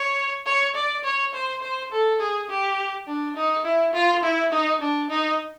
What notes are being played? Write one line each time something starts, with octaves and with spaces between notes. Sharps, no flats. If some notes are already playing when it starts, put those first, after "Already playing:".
Already playing: C#5
C#5
D5
C#5
C5
C5
A4
G#4
G4
D4
D#4
E4
F4
E4
D#4
D4
D#4